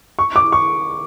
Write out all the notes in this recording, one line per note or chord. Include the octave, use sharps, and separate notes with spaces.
C#6
D6
C#6